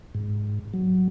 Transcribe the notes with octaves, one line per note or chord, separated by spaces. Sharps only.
G#2
F#3